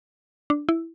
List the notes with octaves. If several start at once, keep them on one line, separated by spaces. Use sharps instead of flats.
D4
E4